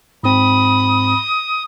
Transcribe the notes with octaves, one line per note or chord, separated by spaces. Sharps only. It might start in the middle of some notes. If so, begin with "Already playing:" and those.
G#2 C4 B5 D#6